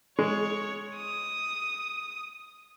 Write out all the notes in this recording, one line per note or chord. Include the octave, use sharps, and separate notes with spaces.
G#3 C#5
D#6